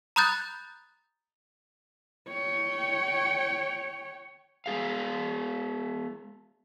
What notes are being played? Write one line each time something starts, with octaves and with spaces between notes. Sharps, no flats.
A#5 B5 D#6 F#6 G6 A6
C#5 G5
G#3 B3 G#4 F5